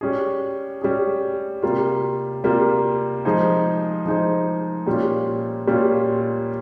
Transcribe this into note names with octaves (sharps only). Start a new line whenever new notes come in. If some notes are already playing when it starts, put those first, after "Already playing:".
G3 C#4 G#4
G3 C#4 G#4
C3 G3 A#3 F4
C3 G3 A#3 F4
F3 G#3 D#4 G#4 C5
F3 G#3 D#4 G#4 C5
A#2 G3 C#4 F4
A#2 G3 C#4 F4